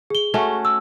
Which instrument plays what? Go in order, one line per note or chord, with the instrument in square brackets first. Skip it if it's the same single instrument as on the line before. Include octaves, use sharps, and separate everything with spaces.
[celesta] G#4 G7
[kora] A3 C#4 F#4
[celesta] E6